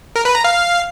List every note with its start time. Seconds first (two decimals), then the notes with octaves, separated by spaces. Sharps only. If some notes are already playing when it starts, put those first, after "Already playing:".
0.16 A#4
0.25 B4
0.35 A#5
0.44 F5